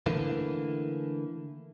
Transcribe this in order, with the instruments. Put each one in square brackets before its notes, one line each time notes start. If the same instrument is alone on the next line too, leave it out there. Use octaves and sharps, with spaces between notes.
[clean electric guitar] D3 E3 A3 A#3